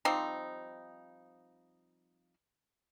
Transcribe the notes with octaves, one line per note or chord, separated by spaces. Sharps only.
F3 G3 C4 D#4